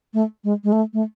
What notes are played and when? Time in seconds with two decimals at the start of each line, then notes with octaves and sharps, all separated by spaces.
0.14 A3
0.44 G#3
0.64 G#3
0.72 A3
0.93 A3